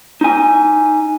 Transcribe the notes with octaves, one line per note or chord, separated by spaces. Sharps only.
D#4 G#5